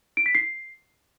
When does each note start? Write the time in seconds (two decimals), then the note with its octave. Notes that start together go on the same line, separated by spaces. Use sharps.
0.17 D7
0.26 B6
0.35 C7